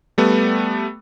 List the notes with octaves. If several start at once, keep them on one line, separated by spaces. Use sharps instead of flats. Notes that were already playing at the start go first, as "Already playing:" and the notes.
G3 A3 B3